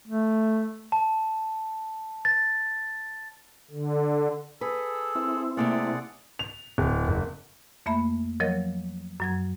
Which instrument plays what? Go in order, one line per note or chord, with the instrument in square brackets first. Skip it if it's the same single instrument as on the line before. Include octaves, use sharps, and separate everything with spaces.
[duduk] A3
[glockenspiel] A5
A6
[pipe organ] D3
[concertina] G#4 A4 [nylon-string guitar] B4 [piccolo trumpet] E6
[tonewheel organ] C4 E4
[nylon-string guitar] C3 A3 A#3 [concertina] G#4 D5 F#5
[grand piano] F7
D1
F#1
[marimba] F2 A3 A#3 E5 B5
F3 F#3 A#4 C#5 D#5
F#2 F#3 G#6